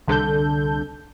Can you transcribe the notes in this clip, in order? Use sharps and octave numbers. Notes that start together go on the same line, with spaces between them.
C2 D3 A4 G6